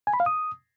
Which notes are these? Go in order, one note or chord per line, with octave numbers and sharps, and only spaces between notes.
G#5
B5
F5
D#6